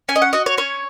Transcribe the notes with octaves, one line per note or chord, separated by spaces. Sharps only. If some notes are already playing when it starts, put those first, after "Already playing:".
C#4 G#5
D#5
F#5
F#4 D#5
C#5
C#4 C#5